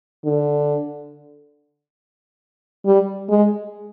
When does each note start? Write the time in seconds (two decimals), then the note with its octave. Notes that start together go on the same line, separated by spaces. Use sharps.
0.25 D3
2.85 G3
3.29 G#3